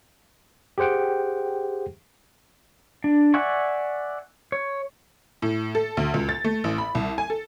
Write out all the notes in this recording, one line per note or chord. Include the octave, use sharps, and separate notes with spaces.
G4 G#4 C5 F#5 G5
D4
D5 E5 F#5 G#5 C#6
C#5
A2
A4
D2
C#2
A6
A3
A1
B5
C2
G#5
A4